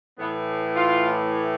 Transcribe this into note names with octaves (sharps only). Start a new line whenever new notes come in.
A2 E3 B3
F4